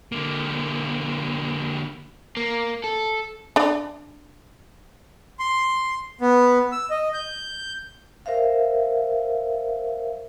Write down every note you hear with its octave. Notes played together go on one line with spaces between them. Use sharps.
D3 A#3
A#3
A4
D4 D5
C6
B3
E6
D#5
G6
A#4 C5 E5 F5